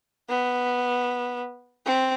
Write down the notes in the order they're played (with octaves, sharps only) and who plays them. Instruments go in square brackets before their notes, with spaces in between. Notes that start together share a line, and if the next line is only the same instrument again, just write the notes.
[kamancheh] B3
C4